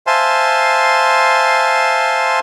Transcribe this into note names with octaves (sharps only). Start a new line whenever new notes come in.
C5 E5 F5 G#5 A5 C6